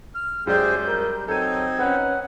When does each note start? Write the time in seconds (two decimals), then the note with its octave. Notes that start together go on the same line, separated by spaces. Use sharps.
0.14 F6
0.47 F#2 G#3 G4 G#4 C5 D5 G6
0.88 G3 A#4
1.28 F#3 C4 D#4 A4 G#6 D#7
1.79 C#4 B4 F#5